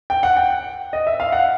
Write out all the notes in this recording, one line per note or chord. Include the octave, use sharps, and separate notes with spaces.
G5
F#5
G5
D#5
E5
F5
F#5